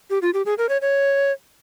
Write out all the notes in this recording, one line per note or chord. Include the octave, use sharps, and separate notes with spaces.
G4
F4
G4
G#4
A#4
C#5
C#5